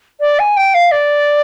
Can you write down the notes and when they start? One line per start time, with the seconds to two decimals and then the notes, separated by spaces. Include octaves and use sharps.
0.20 D5
0.39 G#5
0.57 G5
0.74 F5
0.91 D5